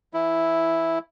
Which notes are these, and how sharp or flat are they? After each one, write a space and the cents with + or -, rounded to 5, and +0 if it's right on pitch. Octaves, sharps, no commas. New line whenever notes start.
E3 +15 E4 +0